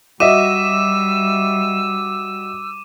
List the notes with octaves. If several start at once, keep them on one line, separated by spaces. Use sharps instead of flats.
G3 F#4 D#5 E5 D6 E6 D#7 E7